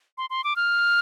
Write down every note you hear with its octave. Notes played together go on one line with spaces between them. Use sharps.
C6
C6
D6
F6